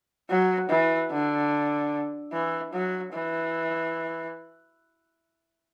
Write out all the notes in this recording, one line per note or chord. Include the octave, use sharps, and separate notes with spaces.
F#3
E3
D3
E3
F#3
E3